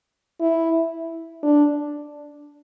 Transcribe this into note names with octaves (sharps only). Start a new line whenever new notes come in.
E4
D4